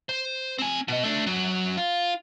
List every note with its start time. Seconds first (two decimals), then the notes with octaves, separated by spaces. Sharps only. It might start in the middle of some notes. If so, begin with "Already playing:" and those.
0.09 C5
0.59 C4 G#5
0.88 B2 D#5
1.03 A3 D4
1.27 F#2 F#3
1.77 F4